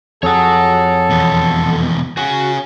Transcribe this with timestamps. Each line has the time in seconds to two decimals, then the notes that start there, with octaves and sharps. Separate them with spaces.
0.23 F2 G#4 A4 C#5 F#5
1.10 E2 B2
2.17 C#4 F#4 G#4